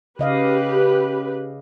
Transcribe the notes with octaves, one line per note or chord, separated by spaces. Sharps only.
C#3 G4 B4 D#5 F5